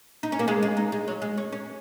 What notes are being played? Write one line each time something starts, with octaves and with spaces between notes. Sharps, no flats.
D#4
C#4
A#3
G#3
G#3
D#4
G#3
F#3
G#3
C#4
C#4